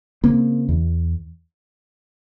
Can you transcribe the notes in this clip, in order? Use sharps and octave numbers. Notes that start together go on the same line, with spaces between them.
C#3 A#3 C4
E2